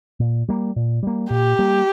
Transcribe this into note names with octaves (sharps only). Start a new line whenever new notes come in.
A#2
G3 A#3
A#2
G3 A#3
A#2 G4
G3 A#3